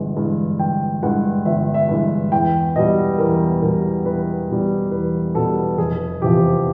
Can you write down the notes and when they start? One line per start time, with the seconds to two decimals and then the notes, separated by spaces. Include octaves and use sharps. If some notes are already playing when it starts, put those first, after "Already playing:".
Already playing: G1 G2 E3 G#3
0.16 G2 E3 G#3
0.59 G1 G5
1.03 G2 E3 G#3 F#5
1.45 G1 E5
1.74 E5
1.89 G2 E3 G#3
2.32 E2 G5
2.76 B2 G3 D#5
3.18 E2 A#4
3.62 B2 G3 A#4
4.05 E2 B4
4.48 B2 G3
4.91 E2 B4
5.35 B2 G3 A4
5.78 F1 G#4
6.22 E2 C3 F3 G4